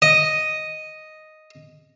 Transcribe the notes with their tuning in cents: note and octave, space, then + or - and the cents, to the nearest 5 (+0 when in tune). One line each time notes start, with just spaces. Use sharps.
D#5 +0